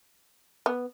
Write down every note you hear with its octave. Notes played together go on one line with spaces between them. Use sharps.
B3